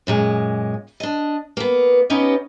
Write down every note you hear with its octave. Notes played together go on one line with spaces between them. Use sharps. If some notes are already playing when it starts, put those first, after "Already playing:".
F#2 A#2 G#3
D4 D#5
A#3 B3
B3 C#4 D#4 G4 D#5